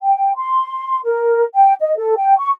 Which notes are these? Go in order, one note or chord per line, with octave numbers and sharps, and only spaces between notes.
G5
C6
A#4
G5
D#5
A4
G5
C#6